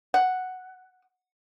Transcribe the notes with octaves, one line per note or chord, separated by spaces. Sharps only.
F#5